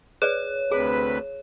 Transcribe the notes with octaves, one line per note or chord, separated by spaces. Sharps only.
G#4 B4 C#5 D5
D2 C3 G#4 B4